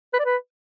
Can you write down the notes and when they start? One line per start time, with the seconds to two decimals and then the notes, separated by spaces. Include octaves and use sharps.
0.14 B4
0.19 D5
0.25 B4